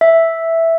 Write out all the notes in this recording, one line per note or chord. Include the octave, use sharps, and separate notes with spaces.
E5